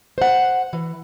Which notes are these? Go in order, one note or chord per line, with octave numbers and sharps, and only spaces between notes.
C5 F#5
E3